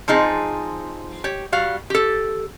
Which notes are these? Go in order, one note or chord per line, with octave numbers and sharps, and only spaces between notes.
F3 C4 D#4 G#4
G4 C#5
G3 F#4 F5
G4 A4